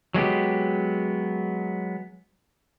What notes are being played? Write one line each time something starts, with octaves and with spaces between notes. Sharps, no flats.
F#3 G#3 B3 G4